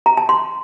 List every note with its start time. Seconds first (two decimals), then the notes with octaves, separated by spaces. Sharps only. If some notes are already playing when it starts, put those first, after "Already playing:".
0.06 A#5
0.17 A5
0.29 C6